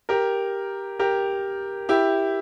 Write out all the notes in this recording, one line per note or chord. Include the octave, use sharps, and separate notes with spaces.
G4 A#4
G4 A#4
E4 G4